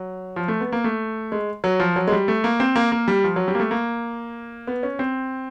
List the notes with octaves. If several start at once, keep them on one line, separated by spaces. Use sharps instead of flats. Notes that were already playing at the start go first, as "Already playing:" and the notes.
Already playing: F#3
F3
A3
B3
A#3
A3
G#3
F#3
F3
F#3
G#3
G3
A3
A#3
C4
A#3
A#3
G3
F3
F#3
G3
A#3
A3
A#3
B3
C#4
C4